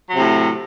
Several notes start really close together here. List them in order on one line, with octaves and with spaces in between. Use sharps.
F#3 C3 A2